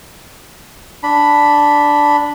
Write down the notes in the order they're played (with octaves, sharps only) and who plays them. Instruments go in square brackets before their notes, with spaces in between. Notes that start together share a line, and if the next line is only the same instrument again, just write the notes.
[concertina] D4 B5